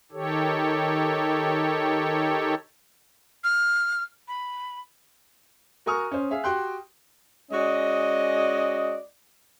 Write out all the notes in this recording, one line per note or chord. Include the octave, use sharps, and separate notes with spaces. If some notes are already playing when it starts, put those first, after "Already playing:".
D#3 G4 A4 C#5
F6
B5
F#4 A#4 G#5 C#6 D#6 F6
C#4 C5
G#4 E5 F5
F#4 G4 G5 C6 F#6
G#3 C#4 F#4 D5 D#5